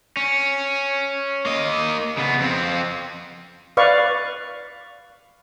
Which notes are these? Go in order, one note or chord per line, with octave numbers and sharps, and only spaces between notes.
C#4
A#3 D#5
C#3 B3
F2 C4
B4 D5 F5 C#6